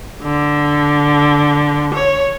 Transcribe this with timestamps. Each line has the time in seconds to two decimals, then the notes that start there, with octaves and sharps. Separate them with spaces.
0.23 D3
1.94 C#5